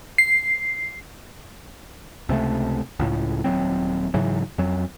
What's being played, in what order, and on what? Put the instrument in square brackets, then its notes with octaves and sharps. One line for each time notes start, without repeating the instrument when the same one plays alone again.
[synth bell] C7
[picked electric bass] C#2 C3 G#3 A3
C#2 A2
D#1 F#3 C4
G#2 C#3 E3 F#3
F2 F#3